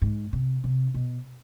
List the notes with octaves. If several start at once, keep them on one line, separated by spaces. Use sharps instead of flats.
G#2
C3
C3
B2